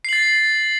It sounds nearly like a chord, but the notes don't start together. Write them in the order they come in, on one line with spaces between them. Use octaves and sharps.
C7 F#7 A6